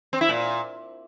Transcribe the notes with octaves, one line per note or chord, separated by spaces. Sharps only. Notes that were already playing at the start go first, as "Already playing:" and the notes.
C4
E4
A#2